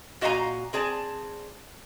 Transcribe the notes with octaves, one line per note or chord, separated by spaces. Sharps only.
A#2 F#4 D#5 F5 G#5 A#5
C4 G#4 D5 A5